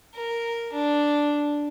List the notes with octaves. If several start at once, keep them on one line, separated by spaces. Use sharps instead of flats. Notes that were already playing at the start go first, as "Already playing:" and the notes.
A#4
D4